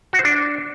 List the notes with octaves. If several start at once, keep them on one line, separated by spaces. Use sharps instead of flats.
F#4
C5
D4